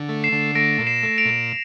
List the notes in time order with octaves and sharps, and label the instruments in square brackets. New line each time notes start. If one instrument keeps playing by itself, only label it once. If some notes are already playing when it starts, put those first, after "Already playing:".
Already playing: [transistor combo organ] D3
A3
[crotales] C7 E7
[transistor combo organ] D3
[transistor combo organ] A3 [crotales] A#6 D7
[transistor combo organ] A#2
[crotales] C7 E7
[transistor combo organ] A3
[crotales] D7 F7
[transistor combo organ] A#2